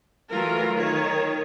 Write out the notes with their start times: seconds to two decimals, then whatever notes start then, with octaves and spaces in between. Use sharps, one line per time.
0.31 E3 F#3 A3 F4 A#4
0.75 D#3 C#5